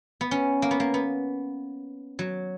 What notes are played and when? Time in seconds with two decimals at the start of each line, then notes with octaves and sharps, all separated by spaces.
0.21 B3
0.31 C#4
0.62 A#3
0.71 B3
0.80 A#3
0.94 B3
2.19 F#3